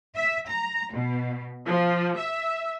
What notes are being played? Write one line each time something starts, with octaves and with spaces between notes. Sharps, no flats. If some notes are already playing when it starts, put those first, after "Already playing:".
E5
A#5
B2
F3
E5